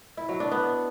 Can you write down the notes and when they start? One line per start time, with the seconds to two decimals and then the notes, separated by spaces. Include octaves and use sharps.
0.17 E4
0.29 F#3
0.40 D4
0.51 B3